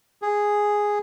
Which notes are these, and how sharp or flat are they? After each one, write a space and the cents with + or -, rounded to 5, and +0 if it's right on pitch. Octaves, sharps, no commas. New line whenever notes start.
G#4 -5